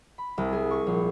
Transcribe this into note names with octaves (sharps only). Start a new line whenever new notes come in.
B5
C2
G#4
C#6
A#1